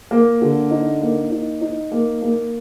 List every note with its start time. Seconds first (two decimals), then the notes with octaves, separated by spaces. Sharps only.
0.11 A#3
0.42 D3
0.71 D#4
1.01 A#3
1.31 D#4
1.61 D#4
1.91 A#3
2.22 A#3